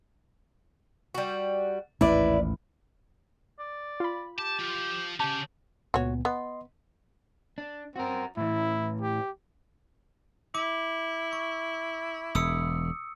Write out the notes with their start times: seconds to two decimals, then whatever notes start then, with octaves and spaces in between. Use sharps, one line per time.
1.14 G3 F#4
2.01 A1 D#2 G#2 E4 B4 D5
3.59 D5
4.00 F4 B5
4.38 G4 A5
4.59 F3
5.20 C#3 C#4 G4 A5
5.94 C#2 A#2 B3 F#4 C#5
6.25 B3 D#5 C6
7.58 D4
7.96 C4 F#4 A#4
8.37 A2 E3 E4
9.02 G4
10.55 E4 D6
11.33 C#6
12.35 E1 D#6 E6 C#7